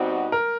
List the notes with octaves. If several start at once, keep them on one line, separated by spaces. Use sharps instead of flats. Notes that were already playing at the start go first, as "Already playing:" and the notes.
Already playing: B2 G3 C4 D#4 F#4
A#4